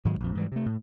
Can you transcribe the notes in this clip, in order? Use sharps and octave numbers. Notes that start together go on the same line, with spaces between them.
G#2 D#3 F#3 G#3
A#1 F2
G#2 E3 G3
C3 A3
A2